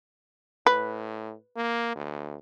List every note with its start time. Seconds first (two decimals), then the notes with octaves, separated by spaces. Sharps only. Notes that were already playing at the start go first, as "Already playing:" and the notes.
0.67 A2 B4
1.56 A#3
1.95 D2